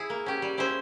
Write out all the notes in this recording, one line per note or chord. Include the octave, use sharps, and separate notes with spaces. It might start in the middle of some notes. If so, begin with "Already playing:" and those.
Already playing: E4 G#4
A#3
C#4 G4
G3
C#4 E4 G#4 C5